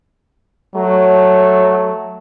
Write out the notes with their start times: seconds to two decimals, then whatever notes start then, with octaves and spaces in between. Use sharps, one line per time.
0.75 F#3 A3